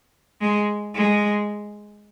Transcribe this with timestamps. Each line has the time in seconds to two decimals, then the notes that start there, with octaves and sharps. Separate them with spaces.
0.41 G#3
0.95 G#3